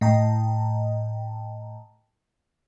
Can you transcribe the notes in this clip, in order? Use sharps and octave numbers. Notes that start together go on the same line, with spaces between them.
A2 D#5 G5 A5 A#5